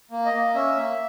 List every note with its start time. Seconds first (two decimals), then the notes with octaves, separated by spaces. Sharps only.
0.11 A#3
0.26 D#5
0.33 A#3
0.55 C#4 E5
0.76 A#3